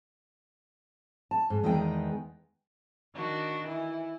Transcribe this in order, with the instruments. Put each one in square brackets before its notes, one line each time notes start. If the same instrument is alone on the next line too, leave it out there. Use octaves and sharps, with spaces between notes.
[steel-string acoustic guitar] A5
G#2
E2 D#3 G#3 B3 G#4 G5
[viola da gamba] D#3 D4 [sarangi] F#4
[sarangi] E3 [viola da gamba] E4